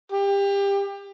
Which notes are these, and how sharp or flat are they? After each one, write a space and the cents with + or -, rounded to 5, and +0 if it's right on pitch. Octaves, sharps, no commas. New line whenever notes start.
G4 +25